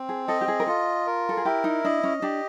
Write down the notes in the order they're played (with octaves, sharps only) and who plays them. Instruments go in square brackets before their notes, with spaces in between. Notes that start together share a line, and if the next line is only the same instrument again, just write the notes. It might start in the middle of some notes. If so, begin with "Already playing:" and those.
Already playing: [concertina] C4
[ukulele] G#4
[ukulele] A4 [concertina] D#5
[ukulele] G4
G#4
A#4
[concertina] F4 [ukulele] A4
[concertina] A#4
[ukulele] A4
G#4
[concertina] E4 [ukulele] G4
[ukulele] D#4
[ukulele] D4 [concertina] D#5
[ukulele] C#4
[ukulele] D4 [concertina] G4